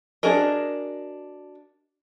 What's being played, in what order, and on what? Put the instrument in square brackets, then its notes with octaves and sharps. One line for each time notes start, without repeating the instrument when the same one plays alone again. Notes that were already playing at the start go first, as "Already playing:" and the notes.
[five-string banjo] D4 F#4 G#4 A#4 D#5